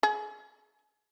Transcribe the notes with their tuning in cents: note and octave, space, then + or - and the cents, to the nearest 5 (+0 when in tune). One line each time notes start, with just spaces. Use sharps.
G#4 +25